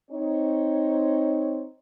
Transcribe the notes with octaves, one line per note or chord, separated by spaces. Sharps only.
C4 D#4 C#5